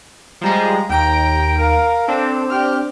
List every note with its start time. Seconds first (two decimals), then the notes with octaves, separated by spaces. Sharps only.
0.41 F3 G3 G#3 A#5
0.89 D#2 G5 A#5 D7
1.58 A#4 F5
2.08 C4 D4 A4
2.49 G4 F6